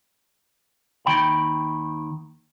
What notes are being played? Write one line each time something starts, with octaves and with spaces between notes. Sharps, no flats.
D#2 D#3 G5 B5